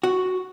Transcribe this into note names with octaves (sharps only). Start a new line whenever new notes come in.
F#4